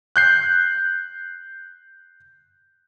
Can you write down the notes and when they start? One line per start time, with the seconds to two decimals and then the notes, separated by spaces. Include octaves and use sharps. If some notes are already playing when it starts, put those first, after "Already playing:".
0.16 F#6 G6 C7